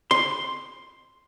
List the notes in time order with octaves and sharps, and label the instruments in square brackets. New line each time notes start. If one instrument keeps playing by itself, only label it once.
[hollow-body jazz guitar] C6